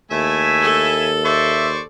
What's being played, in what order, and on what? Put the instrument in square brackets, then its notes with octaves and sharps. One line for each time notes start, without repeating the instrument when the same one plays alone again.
[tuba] D#2 [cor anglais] A3 [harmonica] E4 E5 G#5
[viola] A4
[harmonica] C5 D5 C#6 [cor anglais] E5